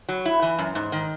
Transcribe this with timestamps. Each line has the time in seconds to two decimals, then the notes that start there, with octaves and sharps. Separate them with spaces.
0.09 F#3
0.25 E4
0.42 E3
0.59 F#2
0.75 G#2
0.92 D#3